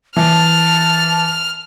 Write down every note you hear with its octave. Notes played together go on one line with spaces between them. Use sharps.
E3 A5 F6